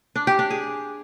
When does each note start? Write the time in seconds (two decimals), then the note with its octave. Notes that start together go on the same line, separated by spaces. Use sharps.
0.16 D4
0.27 G4
0.39 D4
0.50 G#4